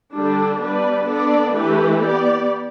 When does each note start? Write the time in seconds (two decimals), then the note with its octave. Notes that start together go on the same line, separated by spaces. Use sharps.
0.13 D3 G3 D4 A4
0.60 G3 B3 D4 B4 D5
1.06 D3 B3 D4 A4 D5
1.52 E3 A3 G4 B4
1.99 B3 G4 D5